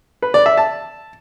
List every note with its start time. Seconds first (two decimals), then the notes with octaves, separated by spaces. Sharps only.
0.22 B4
0.34 D5
0.46 E5
0.57 A5